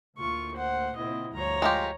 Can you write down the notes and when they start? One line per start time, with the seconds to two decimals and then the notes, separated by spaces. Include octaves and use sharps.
0.18 D2 A2 A#3 F4 C#6
0.55 C5 F#5
0.96 A#2 C#3 C4 E4 D#5
1.33 D2 G2 F3 C#5 A#5
1.62 G#3 F4 G4